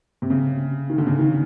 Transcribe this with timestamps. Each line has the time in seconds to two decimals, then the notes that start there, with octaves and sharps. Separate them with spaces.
0.22 C3
0.30 C#3
0.90 D#3
0.98 D3
1.07 C#3
1.19 D#3